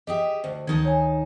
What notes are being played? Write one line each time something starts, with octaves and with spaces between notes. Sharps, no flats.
G4 G#4 D#5 E5 G5
D2 C5
D2 D#3 D#4 A5 G#6
C#5 G#5